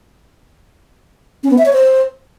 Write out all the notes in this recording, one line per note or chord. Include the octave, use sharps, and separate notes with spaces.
C#4
B3
E5
C#5
C5